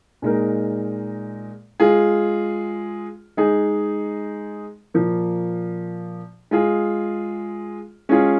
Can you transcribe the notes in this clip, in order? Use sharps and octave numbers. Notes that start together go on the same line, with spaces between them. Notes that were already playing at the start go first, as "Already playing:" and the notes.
A#2 G#3 D#4 A#4
G#3 F4 G#4
G#3 D#4 G#4
A#2 F3 A#3
G#3 F4 G#4
G#3 C#4 F4 G#4